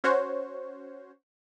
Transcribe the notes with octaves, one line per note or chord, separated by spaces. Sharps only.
C#4 F#4 C5 C#5